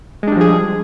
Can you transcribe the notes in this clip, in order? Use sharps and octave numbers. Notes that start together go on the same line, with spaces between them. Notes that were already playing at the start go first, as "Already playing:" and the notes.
F3 G3 G#3 D4 G#4